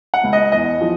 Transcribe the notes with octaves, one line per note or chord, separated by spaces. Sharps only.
F#5
C#2
D#5
E2 D#5
F3